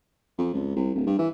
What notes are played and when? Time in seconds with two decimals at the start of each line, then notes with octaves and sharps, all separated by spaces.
0.38 F2
0.54 C#2
0.76 C2
0.95 D1
1.06 G2
1.19 E3